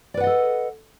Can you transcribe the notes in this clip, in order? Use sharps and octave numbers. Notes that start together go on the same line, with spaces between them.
A4 B4 D5 D#5 F#5